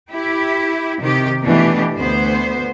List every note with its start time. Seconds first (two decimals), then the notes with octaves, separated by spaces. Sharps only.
0.11 E4 G4
1.01 C3 D#3 G4
1.44 B2 E3 A3 D4 G4
1.98 D2 B3 C5